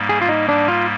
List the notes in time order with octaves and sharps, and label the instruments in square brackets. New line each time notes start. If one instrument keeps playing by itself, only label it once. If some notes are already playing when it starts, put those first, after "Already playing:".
Already playing: [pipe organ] G#2 G3 A#3
[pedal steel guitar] G#4
F4
D#4
D4
F4